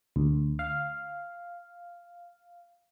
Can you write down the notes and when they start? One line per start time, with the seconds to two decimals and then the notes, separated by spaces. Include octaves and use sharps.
0.16 D2
0.59 F5